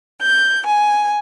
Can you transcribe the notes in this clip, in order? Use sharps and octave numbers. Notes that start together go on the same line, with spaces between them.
G6
G#5